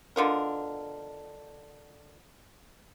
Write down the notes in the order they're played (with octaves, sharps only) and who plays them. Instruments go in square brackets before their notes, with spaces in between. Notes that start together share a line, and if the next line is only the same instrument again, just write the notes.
[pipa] B2 D3 F4 A#4